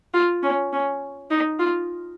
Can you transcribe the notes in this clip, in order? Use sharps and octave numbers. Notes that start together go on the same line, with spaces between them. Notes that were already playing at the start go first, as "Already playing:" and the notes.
F4
C#4
C#4
D#4
F4